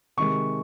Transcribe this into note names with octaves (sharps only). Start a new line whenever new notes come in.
C3 D#3 G#3 C#6